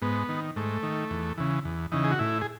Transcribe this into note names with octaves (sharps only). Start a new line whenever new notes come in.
G#2 B3
D#3
G#2 A3
D#3
E2
C#3 E3
E2
C#3 E3 D#4
G#4
F#4
A2 E4
G#4